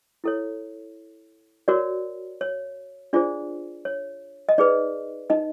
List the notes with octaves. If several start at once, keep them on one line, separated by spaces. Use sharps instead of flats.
E4 A4 C#5
F#4 A#4 C#5 D5
C#5
D4 F4 G#4 C5 D5
C#5
D#5
D#4 G#4 B4 D5
D#4 D#5